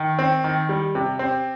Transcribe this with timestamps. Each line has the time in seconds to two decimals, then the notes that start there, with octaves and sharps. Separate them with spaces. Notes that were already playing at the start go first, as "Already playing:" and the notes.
Already playing: D#3
0.19 C4
0.44 D#3
0.69 G3
0.95 C3
1.19 C4